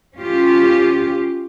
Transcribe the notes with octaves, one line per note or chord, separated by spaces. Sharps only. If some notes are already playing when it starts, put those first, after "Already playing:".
C#4 F4 G4